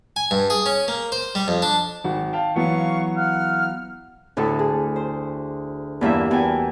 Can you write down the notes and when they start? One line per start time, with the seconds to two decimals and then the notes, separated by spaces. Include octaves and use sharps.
0.16 G#5
0.31 G2
0.50 G#4
0.66 C#4
0.88 A#3
1.12 C5
1.35 G3
1.48 F2
1.62 D4
2.04 G#1 F#4
2.33 F5 G5 A5
2.56 E3 F#3 B3 F5 C#6
3.16 F5 F#5 F6
4.37 D2 A2 F#4 A4
4.59 G#4
4.96 C5
6.01 E2 G2 A#3 E5
6.31 E2 F#4 G5 G#5